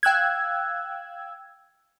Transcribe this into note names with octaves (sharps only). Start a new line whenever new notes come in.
F5 G5 E6 F#6 G#6